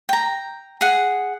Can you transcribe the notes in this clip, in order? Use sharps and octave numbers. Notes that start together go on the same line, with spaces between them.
G5 A#5
G#4 F#5